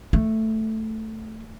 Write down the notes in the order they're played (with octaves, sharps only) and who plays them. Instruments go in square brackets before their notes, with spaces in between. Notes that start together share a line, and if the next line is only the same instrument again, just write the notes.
[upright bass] A3